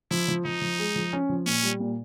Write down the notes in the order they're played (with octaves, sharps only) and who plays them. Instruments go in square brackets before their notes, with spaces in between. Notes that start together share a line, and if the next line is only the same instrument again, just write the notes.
[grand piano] F3 [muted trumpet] E4
[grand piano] F3
[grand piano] F3 [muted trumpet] D#4
[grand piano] F3
G#3
F3
C#4
F3
[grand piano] A#2 [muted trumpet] C#4
[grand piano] G3
A#2